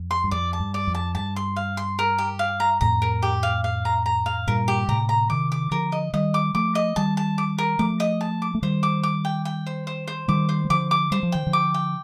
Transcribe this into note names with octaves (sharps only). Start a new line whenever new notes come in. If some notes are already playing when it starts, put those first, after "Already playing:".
Already playing: F2
C6
G2
F2 D5
A5
G2
D5
F2
A5
G2 A5
C6
F5
C6
A#4
G4
F5
A#5
F2 A2 A#5
A#4
G4
F5
F5
A#5
A#5
F5
G2 A#2 A#4
G4
A2 C3 A#5
A#5
C3 D#3 D6
D6
D3 F3 A#4
D#5
D#3 G3 D#5
D6
F3 A3 D6
D#5
D#3 G3 A5
A5
D6
A#4
F3 A3 D6
D#5
A5
D6
A3
D#3 G3 C5
D6
D6
G5
G5
C5
C5
C5
D#3 G3 D6
C5
G3
D3 F3 D6
D6
G3 C5
F3
D#3 G5
D3 F3
D6
G5